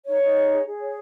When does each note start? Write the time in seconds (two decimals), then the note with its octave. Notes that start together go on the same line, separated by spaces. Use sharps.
0.06 D#4 C#5
0.21 D#4
0.36 G#4
0.51 G#4
0.65 G#4
0.80 C#5